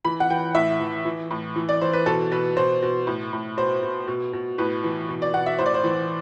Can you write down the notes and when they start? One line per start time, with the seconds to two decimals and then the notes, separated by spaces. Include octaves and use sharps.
0.04 E3 B5
0.20 F#5
0.30 E3 G5
0.55 A2 E5
0.80 E3
1.05 E3
1.31 A2
1.56 E3
1.69 D5
1.81 E3 C5
1.93 B4
2.06 B2 A4
2.31 B2 B4
2.56 B2 C5
2.82 B2
3.07 A2
3.33 A2
3.57 B2 C5
3.83 B2
4.08 B2
4.33 B2
4.58 A2 B4
4.84 E3
5.09 B2
5.22 D5
5.34 B2 F#5
5.46 E5
5.58 A2 C5
5.66 D5
5.74 C5
5.84 E3